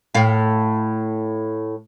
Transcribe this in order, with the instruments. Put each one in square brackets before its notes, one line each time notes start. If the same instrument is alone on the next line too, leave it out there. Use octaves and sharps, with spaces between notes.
[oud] A2 F5